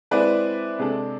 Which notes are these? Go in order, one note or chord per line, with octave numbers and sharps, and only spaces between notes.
G#3 C4 E4 B4 D5
C3 G#3 D4 A4